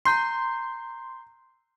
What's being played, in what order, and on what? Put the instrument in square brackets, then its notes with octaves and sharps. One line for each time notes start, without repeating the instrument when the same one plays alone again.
[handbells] A#5 G6 C7 [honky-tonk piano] C6